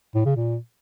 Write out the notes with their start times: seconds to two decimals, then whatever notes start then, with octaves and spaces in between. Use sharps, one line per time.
0.15 A2
0.25 C#3
0.36 A#2